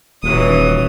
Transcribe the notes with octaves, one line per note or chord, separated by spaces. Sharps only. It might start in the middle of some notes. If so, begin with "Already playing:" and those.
D#1 E3 F#3 D#6